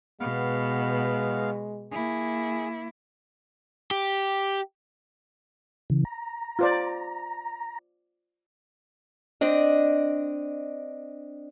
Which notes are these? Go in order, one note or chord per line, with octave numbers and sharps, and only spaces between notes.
B2 G#3 B3 F5
A#3 E4 G#4
G4
C#3 E3
A#5
F4 C5 D5
C4 D4 D#5